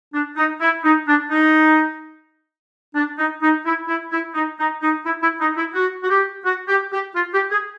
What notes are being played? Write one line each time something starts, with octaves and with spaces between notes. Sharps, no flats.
D4
D#4
E4
D#4
D4
D#4
D4
D#4
D#4
E4
E4
E4
D#4
D#4
D#4
E4
E4
D#4
E4
F#4
F#4
G4
F#4
G4
G4
F4
G4
G#4